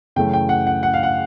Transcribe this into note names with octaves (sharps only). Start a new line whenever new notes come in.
F#2 C#3 E3 A3 G5
G5
F#5
F#5
F#5
F5
F#5